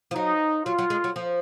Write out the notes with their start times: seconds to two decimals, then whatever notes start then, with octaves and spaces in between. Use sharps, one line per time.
0.11 F3
0.15 F#3 D#4
0.65 F#3 F4
0.78 F#3
0.90 G#3
1.04 F#3
1.16 F3